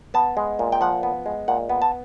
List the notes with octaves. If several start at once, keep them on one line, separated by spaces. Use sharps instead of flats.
B3 A5
G#3
A#2
G5
F3 F#5
B3
G#3
A#2 F#5
B3
A5